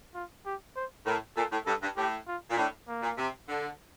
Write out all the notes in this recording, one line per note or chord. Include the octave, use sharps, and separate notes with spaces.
F4
G4
C5
A2 A#4
A#2 A4
A2
G2 A4
G2
A2 G4
F4
A#2
A2 D4
A#3
A#2
C3
D3